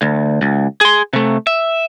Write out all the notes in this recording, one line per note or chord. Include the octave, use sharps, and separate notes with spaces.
D2
C#2
G#4 C6
C3 A3
E5